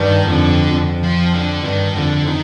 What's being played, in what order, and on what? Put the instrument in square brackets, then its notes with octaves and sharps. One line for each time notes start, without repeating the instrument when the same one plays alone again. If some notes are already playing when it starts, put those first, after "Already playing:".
Already playing: [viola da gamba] G2 [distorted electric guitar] D#3
[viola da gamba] F2 [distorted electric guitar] D3
[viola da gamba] F2
[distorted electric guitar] F3
D3
[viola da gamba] G2 [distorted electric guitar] D#3
[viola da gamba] F2 [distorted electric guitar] D3
[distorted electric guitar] D#3